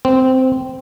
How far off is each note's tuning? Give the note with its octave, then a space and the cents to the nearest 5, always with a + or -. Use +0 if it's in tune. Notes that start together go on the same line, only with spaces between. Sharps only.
C4 -10